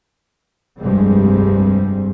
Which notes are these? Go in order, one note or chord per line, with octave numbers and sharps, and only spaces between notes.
F1 C2 G2 G3 G#3 C4